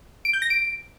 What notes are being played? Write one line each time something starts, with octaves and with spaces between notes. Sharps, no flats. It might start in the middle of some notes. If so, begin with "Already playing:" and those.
D7
G6
A#6
D7